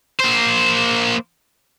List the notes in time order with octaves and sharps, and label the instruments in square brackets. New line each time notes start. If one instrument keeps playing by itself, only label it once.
[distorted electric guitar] A#3 C5